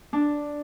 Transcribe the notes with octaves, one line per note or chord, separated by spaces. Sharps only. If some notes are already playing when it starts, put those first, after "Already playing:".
D4